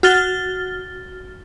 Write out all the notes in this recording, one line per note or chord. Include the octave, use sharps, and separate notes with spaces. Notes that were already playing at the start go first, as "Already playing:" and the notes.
F#4 F6 A6 G7